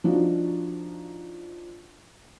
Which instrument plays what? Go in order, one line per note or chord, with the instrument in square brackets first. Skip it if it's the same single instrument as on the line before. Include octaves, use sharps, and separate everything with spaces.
[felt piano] F3 D4 D#4 F4 F#4